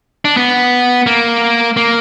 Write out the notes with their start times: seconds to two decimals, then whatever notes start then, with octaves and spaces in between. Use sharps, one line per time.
0.25 D4
0.37 B3
1.06 A#3
1.77 A#3